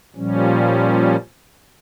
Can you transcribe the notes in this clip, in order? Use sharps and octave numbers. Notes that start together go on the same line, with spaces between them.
A#2 F3 G3 C#4